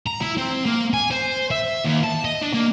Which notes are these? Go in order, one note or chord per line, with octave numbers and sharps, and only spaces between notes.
A#5
E4
C4
A#3
G#5
C5
E5
D#2
A5
D#5
D4
A#3